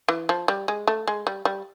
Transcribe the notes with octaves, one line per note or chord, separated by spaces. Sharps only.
E3
F3
G3
G#3
A3
G#3
G3
G3